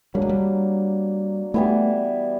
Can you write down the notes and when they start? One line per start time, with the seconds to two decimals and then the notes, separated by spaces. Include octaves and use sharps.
0.14 F#3 G3 A#3 D4
0.22 G#3
0.29 G3
1.54 E3 G3 A3 B3 E4